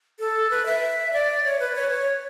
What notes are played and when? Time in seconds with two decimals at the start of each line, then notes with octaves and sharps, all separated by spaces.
0.19 A4
0.50 B4
0.66 E5
1.13 D5
1.44 C#5
1.60 B4
1.75 C#5
1.91 C#5